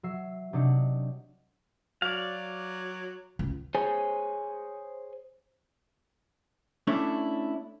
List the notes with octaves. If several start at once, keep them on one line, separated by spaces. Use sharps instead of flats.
F#3 E5 E6 C7
C3 F#3 D4 D#4 C#7
F#3 D5 F5
C#2
G#4 C5 C#5 G#5
A3 C#4 D4 E4